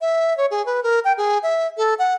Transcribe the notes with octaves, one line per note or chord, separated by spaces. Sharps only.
E5
C#5
G#4
B4
A#4
G5
G#4
E5
A4
F#5